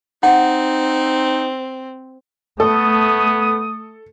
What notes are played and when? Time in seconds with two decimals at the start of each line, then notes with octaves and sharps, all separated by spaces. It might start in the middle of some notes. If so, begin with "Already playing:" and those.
0.23 C4 D#4 F#5
2.60 A3 B3 A4 D#6